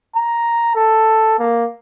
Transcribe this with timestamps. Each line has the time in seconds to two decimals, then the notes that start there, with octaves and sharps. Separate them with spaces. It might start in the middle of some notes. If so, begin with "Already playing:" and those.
0.16 A#5
0.75 A4
1.39 A#3